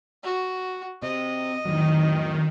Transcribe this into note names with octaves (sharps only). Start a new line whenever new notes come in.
F#4
C3 D#5
F2 A2 D#3 F#3